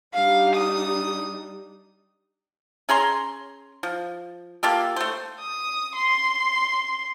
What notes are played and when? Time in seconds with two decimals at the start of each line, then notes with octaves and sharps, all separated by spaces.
0.14 G3 D4 D#4 F5
0.55 D#6
2.89 C#4 G#4 A#5 C6
3.83 F3
4.63 A#3 F4 G4 A4
4.96 A3 C5
5.40 D#6
5.95 C6